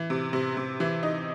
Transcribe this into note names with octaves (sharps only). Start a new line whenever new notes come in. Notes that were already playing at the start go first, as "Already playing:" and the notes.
Already playing: E3
C3
C3
C3
E3
D#4